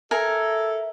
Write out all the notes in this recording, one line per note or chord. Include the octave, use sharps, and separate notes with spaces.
A4 A#4 E5 G#5